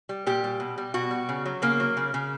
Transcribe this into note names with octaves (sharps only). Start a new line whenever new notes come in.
G3
A#2 G4
G3
B2
G3
B2 F#4
G3
C#3
F#3
C#3 A#3
F#3
C#3
C#3